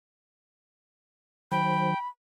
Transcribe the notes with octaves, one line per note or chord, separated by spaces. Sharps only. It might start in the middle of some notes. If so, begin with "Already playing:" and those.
D#3 F#3 C5 G5 B5